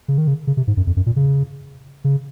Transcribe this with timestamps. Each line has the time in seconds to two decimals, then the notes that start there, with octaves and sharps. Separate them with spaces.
0.08 C#3
0.18 D#3
0.28 C#3
0.47 C#3
0.57 C3
0.67 G#2
0.77 F#2
0.87 F2
0.96 F#2
1.06 A#2
1.16 C#3
2.04 C#3